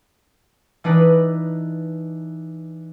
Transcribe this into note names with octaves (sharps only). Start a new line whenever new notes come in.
E3 D4 D#4 B4